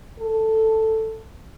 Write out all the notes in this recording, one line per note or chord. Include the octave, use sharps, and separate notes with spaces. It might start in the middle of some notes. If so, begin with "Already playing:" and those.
A4